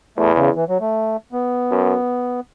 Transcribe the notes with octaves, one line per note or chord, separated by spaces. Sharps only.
E2 A3
C#3
E3
F#3
A3
B3
F#2